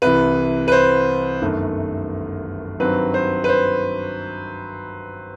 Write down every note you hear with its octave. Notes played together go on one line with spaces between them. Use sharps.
C2 C3 E3 B4
B4
C5
G1 F#2 D#3 A3
G2 D#3 F#3 C4 B4
C5
B4
C5